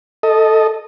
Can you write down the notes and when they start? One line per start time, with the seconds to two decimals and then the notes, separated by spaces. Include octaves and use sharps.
0.23 A4 D#5